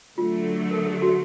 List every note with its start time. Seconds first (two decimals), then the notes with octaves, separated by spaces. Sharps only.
0.18 D3 F#3 A3 F4
0.71 A#4
0.78 A4
0.87 G#4
0.94 G4
1.02 F#4